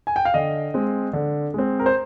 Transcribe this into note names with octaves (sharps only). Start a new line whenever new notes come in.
G#5
G5
F5
D3 D#5
G#3 C4
D3
G#3 C4
A#4
C5